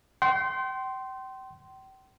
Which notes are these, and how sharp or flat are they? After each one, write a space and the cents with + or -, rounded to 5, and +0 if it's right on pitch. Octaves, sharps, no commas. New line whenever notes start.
G5 -35 C6 +0